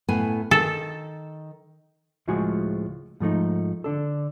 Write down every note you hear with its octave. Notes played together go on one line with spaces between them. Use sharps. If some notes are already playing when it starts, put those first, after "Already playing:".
A2 B3 G#5
D#3 A4
C#2 A2 F3 G#3 F#4 G#5
G#2 F3 A3 D#4
D3 D4 A4